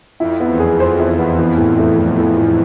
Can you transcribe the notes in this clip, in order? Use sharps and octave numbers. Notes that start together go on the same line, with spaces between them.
F2 E4
B3
E2
G#4
F2 C5
E4
B3
E3
A2
A3
A2
E3
A2